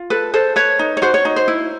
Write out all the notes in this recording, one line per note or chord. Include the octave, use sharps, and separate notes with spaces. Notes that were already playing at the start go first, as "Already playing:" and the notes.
Already playing: F4
A4 B4
A4 C5
B4 C#5
D#4
C#5
F#4 C5
C#5
D#4
C5
E4